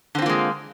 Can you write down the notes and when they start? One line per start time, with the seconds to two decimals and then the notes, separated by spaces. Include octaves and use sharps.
0.15 D3
0.18 C4
0.22 F4
0.26 A#3
0.29 G#3